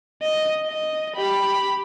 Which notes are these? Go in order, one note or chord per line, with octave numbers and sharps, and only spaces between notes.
D#5
D#5
G4 B5